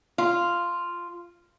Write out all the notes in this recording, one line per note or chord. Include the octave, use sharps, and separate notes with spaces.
F4